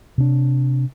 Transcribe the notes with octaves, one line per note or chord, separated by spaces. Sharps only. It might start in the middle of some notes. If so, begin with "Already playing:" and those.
C3 D4